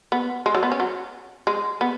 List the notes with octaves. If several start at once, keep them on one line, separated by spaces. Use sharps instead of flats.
B3
G#3
F#3
B3
C#4
F#3
G#3
B3